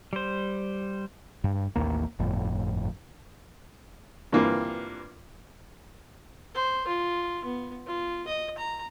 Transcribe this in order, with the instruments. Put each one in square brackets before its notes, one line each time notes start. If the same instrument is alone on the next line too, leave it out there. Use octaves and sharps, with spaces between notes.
[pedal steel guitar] G3 C5
[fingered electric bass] G2
A1 D#2 G#2 A#3
G1 F2 A2
[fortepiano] G2 E3 A#3 C4 F4
[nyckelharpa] C5
F4
B3
F4
D#5
A#5